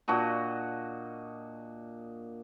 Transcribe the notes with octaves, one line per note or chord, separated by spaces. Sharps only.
A#2 D4 F#4 D#5